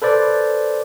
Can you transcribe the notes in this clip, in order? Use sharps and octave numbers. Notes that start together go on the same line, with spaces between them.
A4 B4 C5 D5